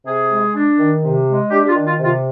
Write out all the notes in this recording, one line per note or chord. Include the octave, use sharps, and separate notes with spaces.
C3 G#4
G#3
D4
D#3
C3
G#3
D4 G4
G4
F4
D#3
F4
C3
F4